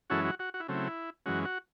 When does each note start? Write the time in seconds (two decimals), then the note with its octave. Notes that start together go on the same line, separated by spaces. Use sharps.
0.10 F#2 E3 G#3 C#4 E4 F#4 A4
0.25 F#4
0.39 F#4
0.54 F#4
0.60 E4
0.68 C#3 F#3 A3 C4
0.75 E4
1.26 F#2 E3 G#3 C#4 F#4
1.45 F#4